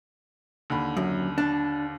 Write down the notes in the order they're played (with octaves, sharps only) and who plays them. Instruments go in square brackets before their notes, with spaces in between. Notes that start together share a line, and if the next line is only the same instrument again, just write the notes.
[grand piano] D#2 D3 B5
[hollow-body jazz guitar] F#2
D4